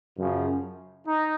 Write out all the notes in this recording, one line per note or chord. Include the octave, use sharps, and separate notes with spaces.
F#2 C#3 F3
D#4